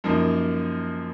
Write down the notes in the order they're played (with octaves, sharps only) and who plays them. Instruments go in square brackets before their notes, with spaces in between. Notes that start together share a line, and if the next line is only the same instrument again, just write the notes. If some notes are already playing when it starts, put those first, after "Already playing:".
[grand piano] F#2 F3 A#3 D#4